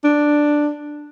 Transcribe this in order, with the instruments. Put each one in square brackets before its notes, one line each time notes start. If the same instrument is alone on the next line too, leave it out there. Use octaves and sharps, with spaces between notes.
[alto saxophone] D4